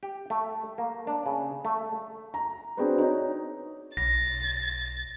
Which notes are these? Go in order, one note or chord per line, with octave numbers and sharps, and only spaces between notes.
G4
A3
A#3
D4
C#3
A3
A#5
C4 D4 F#4 G#4 B4
D#4 C#5
B1 A6 A#6